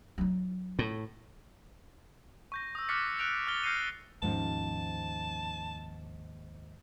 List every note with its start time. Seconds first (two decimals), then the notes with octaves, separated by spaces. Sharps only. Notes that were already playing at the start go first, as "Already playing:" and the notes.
0.18 F#3 D#4
0.79 A2
2.52 C#6 G6 A#6
2.75 D#6 E6
2.89 D6 F6 F#6 A6 B6 C#7
3.19 F#6 D7 F7
3.47 F6 A6 G7
3.63 F6 G6 A#6 C7 C#7 D#7
4.22 D#2 G#2 F3 C#4 A5